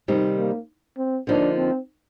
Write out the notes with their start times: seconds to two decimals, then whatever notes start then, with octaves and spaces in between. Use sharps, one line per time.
0.08 C3 D#3 G3 C4 D#4
0.38 A#3
0.97 C4
1.27 D3 F3 A#3 D4 D#4
1.57 C4